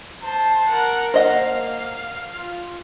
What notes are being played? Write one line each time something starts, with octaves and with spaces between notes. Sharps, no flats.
C5 A5
A#4 F#5
A#3 C5 D#5 F5 F#5
F4